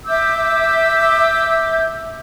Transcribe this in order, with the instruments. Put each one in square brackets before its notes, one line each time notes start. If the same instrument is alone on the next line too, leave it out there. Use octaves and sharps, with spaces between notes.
[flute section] E5 D6 E6 G6